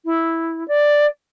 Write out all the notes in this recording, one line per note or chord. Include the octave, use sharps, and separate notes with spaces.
E4
D5